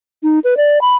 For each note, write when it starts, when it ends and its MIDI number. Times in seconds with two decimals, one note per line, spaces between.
0.23 0.39 63
0.44 0.57 71
0.57 0.81 74
0.81 0.95 83